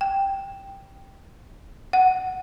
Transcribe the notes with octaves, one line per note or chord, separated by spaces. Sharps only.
G5
F#5